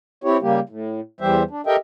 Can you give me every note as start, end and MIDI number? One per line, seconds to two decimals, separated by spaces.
0.24 0.37 60
0.24 0.37 64
0.24 0.37 67
0.24 0.37 73
0.42 0.60 49
0.42 0.60 55
0.42 0.60 58
0.42 0.60 67
0.69 1.00 45
1.21 1.43 40
1.21 1.43 52
1.21 1.43 55
1.21 1.43 67
1.21 1.43 72
1.21 1.43 76
1.51 1.61 62
1.67 1.76 67
1.67 1.76 69
1.67 1.76 70
1.67 1.76 75
1.67 1.76 76
1.67 1.76 79